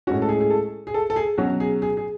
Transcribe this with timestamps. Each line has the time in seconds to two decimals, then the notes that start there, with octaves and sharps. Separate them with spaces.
0.07 A2 G#3 C#4 F#4
0.22 A4
0.29 G#4
0.40 G#4
0.50 A4
0.87 G#4
0.94 A4
1.10 A4
1.16 G#4
1.38 B2 F#3 C#4 F#4
1.60 G#4
1.82 G#4
1.97 G#4